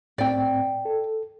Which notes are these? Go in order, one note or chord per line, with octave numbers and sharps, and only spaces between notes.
A2 C4 D5 G5
A4